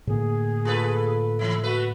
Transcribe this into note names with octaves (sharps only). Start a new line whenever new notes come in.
A2 D3 A#3 G#4
F4 A4 B4
E3 E4
A3 F#4 B4